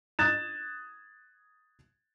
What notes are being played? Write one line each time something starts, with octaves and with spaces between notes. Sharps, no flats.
D#6 F#6 G#6 A6 E7